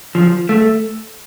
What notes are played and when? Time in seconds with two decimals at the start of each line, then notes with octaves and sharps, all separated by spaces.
0.15 F3
0.49 A3